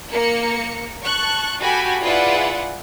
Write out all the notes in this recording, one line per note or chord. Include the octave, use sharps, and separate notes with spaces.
A#3 C#7
A5 C#6 F#6
F#4 G4 A4 G#5 B5
E4 F4 G#4 B4 D5 F#5